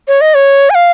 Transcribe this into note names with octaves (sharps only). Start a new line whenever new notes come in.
C#5
D#5
C#5
G#5
F5